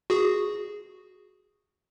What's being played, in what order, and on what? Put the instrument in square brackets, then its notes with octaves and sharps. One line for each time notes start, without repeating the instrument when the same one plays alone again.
[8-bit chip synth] F#4 G#4